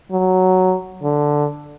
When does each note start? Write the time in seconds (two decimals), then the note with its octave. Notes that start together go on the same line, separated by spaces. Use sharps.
0.12 F#3
1.03 D3